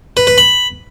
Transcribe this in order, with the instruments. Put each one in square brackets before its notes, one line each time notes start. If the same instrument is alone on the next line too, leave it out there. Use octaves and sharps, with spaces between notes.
[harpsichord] B4
B4
B5